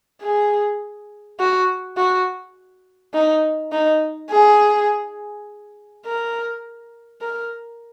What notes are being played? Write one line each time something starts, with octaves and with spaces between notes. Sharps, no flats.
G#4
F#4
F#4
D#4
D#4
G#4
A#4
A#4